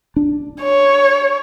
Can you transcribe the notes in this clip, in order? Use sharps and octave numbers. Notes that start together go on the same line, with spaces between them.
D4
C#5